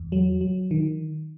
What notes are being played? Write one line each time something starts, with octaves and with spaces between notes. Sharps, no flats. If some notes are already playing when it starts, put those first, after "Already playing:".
Already playing: E2
F#3
F#3
D#3